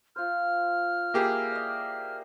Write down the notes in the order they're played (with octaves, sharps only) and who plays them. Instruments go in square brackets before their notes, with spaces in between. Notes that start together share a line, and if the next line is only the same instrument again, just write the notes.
[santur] F4 C5 [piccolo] F6
[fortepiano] A#3 G4 G#4 [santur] E4
[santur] D5 D#5